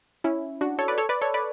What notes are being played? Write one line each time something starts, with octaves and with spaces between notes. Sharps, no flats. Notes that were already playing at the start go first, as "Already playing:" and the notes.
C#4 E4
D4 F#4
A4 C#5
B4 D5
A4 C#5
B4 D5
A4 C#5
B4 D5